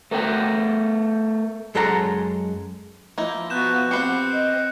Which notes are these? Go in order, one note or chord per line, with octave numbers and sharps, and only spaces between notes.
A3 A#4 F#5 G5
F#2 G#3 A4 C#5 F#5 A#5
F3 A#3 D#4 E4
B3 F#4 F#6 G6 E7
C4 G4 B4 F#5 C7 C#7
D#5